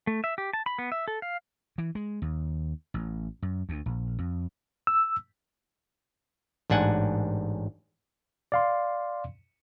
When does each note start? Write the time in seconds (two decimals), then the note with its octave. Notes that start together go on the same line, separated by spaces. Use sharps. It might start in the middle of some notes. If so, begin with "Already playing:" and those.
0.07 A3
0.24 E5
0.38 G4
0.53 A5
0.66 B5
0.79 B3
0.92 E5
1.08 A4
1.22 F5
1.78 E3
1.95 G#3
2.22 D#2
2.94 A1
3.42 F#2
3.69 D2
3.86 A#1
4.19 F2
4.87 E6
6.70 A1 G#2 D4 F#5 G#5
8.52 D5 F5 C6